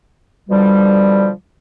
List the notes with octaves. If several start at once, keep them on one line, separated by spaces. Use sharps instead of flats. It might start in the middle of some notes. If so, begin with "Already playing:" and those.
B2 D3 F3 G3